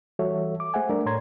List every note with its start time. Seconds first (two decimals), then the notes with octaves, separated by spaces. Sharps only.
0.19 E3 G3 F#4 A4 C#5 E5
0.60 D6
0.74 A3 G#4 C5 E5 F#5 G#5
0.89 G3 A3 D4 A#4 D5
1.06 A2 A4 C#5 A#5 C6 G#6